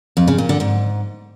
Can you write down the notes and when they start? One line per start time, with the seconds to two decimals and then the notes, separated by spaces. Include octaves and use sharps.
0.17 F2
0.28 C#3
0.38 A#2
0.49 D3
0.60 G#2